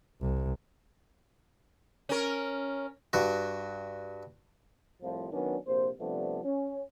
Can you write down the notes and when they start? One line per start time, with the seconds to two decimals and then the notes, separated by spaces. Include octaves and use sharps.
0.20 C2
2.09 C#4 A#4
3.13 G2 F#4
5.02 C2 A2 F3
5.32 D#3 F#3 B3 C#4 D4
5.67 A#1 C3 A#3 C5
6.00 C3 F3 G3 A3 B3 D4
6.44 C#4